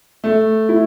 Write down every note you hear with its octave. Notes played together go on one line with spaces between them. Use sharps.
A3
E4